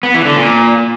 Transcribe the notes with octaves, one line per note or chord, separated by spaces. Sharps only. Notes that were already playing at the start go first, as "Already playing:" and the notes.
B3
E3
D3
A#2